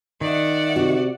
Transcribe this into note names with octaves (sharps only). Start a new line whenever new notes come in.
D#3 D5 E5 F#5
C3 F#4